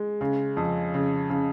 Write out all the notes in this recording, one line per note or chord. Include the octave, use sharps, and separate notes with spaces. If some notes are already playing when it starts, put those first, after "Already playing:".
Already playing: G#3
C#3
F2
C#3
C#3